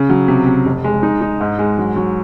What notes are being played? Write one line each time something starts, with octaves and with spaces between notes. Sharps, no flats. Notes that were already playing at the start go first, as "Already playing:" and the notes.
Already playing: C#3
F#3
C3
C3
F1
G#3
D#4
D#4
G#2
G#3
F#3
F#3